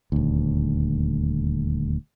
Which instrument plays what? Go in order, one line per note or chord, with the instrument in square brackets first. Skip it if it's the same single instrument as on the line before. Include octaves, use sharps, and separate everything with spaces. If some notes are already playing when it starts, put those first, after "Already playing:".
[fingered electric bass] D#1 D2